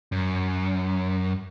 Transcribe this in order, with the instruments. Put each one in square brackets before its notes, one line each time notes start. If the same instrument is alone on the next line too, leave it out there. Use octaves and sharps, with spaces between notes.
[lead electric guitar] F#2